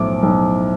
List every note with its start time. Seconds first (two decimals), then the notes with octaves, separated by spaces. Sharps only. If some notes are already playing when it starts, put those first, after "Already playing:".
Already playing: B1 A2 F3 D6
0.23 B1